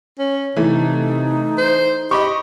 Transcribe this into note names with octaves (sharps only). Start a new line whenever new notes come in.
C#4
C3 E3 A3 D#4
C5
G4 D#5 B5 C#6